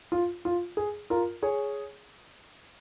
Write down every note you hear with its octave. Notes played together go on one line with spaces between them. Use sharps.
F4
F4
G#4
F4 A#4
G#4 C#5